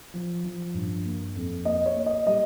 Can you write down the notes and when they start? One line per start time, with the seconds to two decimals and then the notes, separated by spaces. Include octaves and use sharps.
0.14 F3
0.44 F3
0.74 G2
1.05 A#3
1.36 F2
1.65 A#3 D#5
1.86 C#5
1.96 A#3
2.06 D#5
2.26 G3 D#5